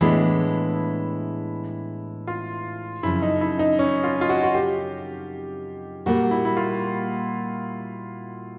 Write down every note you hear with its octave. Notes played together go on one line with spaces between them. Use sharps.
A2 E3 G#3 B3 D4 E4
F4
F#2 C#3 F3 E4
D#4
E4
D#4
C#4
F4
F4
F#4
F#4
G4
A#2 G3 A#3 F#4
E4
E4
F4